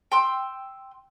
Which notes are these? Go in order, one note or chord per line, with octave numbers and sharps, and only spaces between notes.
G5 C6 E6